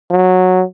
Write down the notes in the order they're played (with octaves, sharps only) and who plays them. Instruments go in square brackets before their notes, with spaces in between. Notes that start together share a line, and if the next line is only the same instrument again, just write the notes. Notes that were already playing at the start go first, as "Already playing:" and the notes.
[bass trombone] F#3